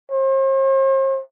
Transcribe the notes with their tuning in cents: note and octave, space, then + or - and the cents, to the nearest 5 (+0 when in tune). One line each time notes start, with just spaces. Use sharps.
C5 +45